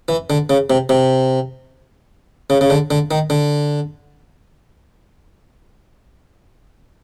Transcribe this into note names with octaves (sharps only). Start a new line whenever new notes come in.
E3
D3
C#3
C3
C3
C#3
C#3
D3
D3
D#3
D3